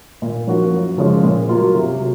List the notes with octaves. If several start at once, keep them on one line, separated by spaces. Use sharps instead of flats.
A#2
F3 A#3 C#4 F#4
F#2
C#3 F3 G#3 C#4
A#2
F#3 A#3 F4
C3
F#3